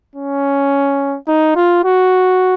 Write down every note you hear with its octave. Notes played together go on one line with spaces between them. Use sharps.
C#4
D#4
F4
F#4